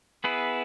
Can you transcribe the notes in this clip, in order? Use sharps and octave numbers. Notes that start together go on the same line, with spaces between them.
B3 E4 G#4 B4